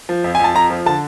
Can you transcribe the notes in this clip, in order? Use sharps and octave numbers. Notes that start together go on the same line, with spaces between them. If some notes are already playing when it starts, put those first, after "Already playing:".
F3
F2
F2 G#5
A5
F2 A#5
F3
D3 A5